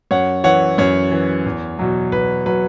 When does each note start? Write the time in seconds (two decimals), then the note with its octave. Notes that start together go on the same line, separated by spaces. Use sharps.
0.11 F#2 C#5 F#5
0.44 E3 C#5 F#5
0.78 F#2 C#5
1.11 E3
1.46 E2
1.79 B2 F#3
2.12 E2 B4
2.46 B2 F#3 B4